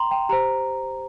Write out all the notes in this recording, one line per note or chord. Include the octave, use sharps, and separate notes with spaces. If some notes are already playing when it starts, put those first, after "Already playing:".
Already playing: G5 A#5 C6
G5
G4 C5 A#5